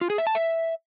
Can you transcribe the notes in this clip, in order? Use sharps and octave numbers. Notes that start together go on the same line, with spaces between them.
F4
G#4
E5
A5
E5